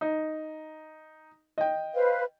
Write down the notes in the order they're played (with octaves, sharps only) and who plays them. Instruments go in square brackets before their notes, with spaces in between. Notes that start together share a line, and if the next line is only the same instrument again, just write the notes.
[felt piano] D#4
D#5 G5
[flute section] B4 C5 F5